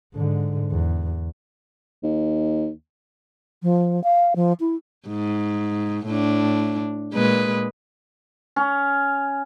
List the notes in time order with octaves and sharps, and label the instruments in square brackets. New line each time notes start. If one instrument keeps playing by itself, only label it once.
[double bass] G#2 D3
E2
[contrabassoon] D#2
[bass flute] F3
F5
F3
E4
[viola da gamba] G#2
A2 D4
A#2 G#3 B4
[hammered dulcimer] C#4